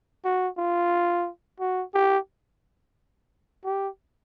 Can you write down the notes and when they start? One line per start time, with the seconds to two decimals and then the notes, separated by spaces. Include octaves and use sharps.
0.25 F#4
0.58 F4
1.60 F#4
1.94 G4
3.65 G4